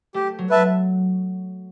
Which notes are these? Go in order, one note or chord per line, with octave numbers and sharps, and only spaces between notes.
A3 G4
F#3
B4 E5 A5